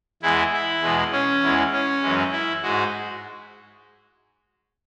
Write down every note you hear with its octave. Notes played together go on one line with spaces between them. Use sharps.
E2 E3 G#3 E4
E4
E2 B2 G#3
C#4
E2 E3 G#3
C#4
F#2 E3 G#3
E4
G#2 G#3 F#4